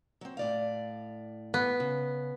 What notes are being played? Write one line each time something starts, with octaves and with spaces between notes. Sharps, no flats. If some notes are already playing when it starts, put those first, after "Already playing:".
F#3 C4
A2 D5 F5
B3
C#3